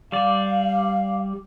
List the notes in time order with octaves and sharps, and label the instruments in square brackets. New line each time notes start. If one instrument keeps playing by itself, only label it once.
[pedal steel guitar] G3 D5 [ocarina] F5